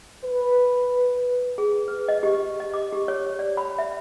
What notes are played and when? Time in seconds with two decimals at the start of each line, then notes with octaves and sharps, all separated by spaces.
0.25 B4
1.58 G#4
1.88 B4
2.08 D#5
2.23 G4
2.60 D#5
2.74 D6
2.92 G4
3.08 C#5
3.39 D5
3.57 B5
3.78 E5